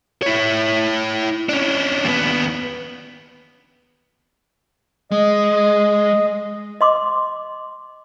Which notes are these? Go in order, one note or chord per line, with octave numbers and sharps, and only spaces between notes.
E4 C#5
C#4 D4
D#2 B3
G#3 D#5
D#5 C6 D6